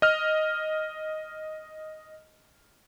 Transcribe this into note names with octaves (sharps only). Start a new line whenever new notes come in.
D#5 F6